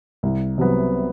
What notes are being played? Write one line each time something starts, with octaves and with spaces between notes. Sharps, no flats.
C2
C3 F#3 B3